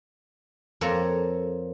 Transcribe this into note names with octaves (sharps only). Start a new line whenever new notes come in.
F2 A#3 A4 C#5 A#5